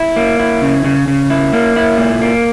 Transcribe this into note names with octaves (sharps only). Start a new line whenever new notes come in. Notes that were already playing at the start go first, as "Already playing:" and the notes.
Already playing: E4
A#3
E4
C#3
C#3
C#3
E4
A#3
E4
A#2
A#3